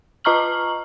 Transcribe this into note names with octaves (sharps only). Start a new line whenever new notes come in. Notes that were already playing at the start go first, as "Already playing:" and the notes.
F4 D#5 A#5 C#6 F6 F#7